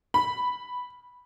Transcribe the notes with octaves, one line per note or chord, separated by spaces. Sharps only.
B5